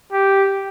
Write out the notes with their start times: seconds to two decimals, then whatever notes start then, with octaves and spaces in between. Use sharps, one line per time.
0.13 G4